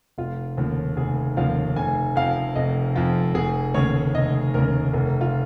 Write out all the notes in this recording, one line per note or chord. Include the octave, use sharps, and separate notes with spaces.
F1 F4
D#2 C#3 F3
F1 G#4
D#2 C#3 F3 F5
F1 G#5
F2 F3 F5
F1 D#5
F2 F3 F4
F1 G#4
D#2 C#3 C#5
F1 D#5
D#2 C#3 A#4
F1 A#4
F4